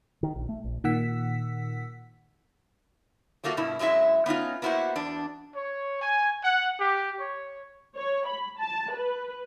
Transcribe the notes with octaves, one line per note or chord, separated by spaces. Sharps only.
D#3
A#1
A3
A#1
A#2 D#3 F#5 E6 B6
F#3 A3 A#3 F4 F#4
G2 B2 E4
F#2 F#3 G#3 E4 E5
B3 C#4 D#4 F4
A#3 B3 E4 F#4 C5 F#5
E2 D4
C#5
G#5
F#5
G4
C#5
C#5
B5
A5
B4